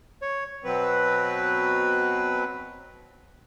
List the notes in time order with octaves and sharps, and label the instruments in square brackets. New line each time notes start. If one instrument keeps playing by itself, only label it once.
[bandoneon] C#5
[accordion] B2 F#3 C4 B4